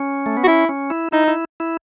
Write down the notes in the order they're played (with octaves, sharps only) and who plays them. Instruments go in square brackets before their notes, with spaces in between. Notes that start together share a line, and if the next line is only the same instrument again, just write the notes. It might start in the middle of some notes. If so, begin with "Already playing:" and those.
Already playing: [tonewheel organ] C#4
A3
B3
[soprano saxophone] F#4
[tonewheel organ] C#4 [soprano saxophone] E4
[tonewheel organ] C#4
E4
[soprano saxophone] D#4 [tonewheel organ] E4
[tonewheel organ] E4
E4